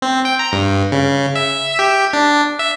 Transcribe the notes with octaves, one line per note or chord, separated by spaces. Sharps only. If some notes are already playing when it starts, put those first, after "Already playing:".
C4
G5
A#5
G2
C#3
E5
G4
D4
E5